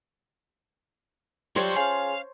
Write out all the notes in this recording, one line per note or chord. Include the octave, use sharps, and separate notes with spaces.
F#3 G3 F4 C5 C#5 A5
C#4 F4 G#4 F5